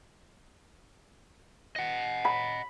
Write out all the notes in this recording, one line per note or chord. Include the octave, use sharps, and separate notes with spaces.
D#5 F#5
B5